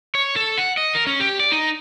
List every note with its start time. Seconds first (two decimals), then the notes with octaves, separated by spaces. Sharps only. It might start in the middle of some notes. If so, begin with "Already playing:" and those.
0.15 C#5
0.36 A4
0.58 F#5
0.77 D#5
0.95 A#4
1.07 C#4
1.20 G4
1.40 D5
1.52 D#4